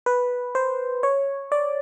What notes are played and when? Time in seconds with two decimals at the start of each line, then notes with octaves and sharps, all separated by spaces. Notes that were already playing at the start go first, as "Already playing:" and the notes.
0.06 B4
0.55 C5
1.03 C#5
1.52 D5